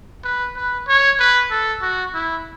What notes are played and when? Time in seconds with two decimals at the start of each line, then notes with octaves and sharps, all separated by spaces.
0.24 B4
0.57 B4
0.88 C#5
1.20 B4
1.51 A4
1.82 F#4
2.14 E4